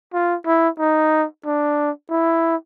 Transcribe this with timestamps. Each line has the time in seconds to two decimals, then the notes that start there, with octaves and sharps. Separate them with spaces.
0.13 F4
0.46 E4
0.79 D#4
1.45 D4
2.10 E4